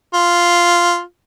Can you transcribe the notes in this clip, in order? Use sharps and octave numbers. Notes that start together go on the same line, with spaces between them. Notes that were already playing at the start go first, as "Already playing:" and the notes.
F4